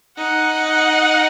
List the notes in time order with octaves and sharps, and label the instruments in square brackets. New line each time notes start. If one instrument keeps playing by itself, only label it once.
[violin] D#4 [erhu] F#5